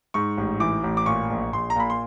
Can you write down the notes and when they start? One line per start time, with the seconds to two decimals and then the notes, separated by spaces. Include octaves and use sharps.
0.14 G#2 C#6
0.38 A1
0.60 E3 D6
0.84 A1
0.97 D6
1.06 A#2 C#6
1.30 A#1
1.53 A#1 C6
1.70 A#5
1.76 A#2 B5
1.90 C6